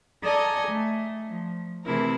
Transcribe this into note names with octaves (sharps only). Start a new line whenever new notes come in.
A4 D5 D#5 G#5 A#5
A3
F3
C3 E3 A3 E4 G#4 A#4